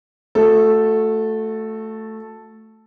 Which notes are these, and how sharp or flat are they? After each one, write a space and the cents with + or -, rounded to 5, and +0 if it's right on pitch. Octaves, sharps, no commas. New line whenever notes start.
A3 +0 F#4 -30 A4 +0